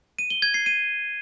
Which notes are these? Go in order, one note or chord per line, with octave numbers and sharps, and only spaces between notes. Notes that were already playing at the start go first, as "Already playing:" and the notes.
D#7
G7
G#6
C7
D#7